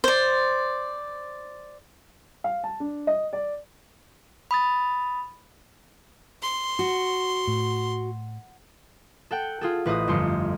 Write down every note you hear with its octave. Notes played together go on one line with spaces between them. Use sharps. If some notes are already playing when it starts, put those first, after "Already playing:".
C5 D5
F5
A5
D4
D#5
D5
B5 D#6 A6
C6
F#4
A2
A4 F#5 G5
F4 G#4 A4
A1 B4 C5 D#5 D#6
G1 F2 A3 C6 C#7